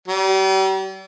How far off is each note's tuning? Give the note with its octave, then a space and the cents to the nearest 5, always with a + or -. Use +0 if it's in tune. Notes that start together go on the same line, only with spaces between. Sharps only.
G3 -40